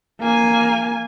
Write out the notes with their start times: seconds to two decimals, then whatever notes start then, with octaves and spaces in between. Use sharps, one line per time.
0.21 A#3 G#5